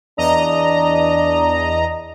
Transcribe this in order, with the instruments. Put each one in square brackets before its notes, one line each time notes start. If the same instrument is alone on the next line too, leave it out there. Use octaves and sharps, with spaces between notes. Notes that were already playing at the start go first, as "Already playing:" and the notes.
[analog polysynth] E2 D#5 A#5 [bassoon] D4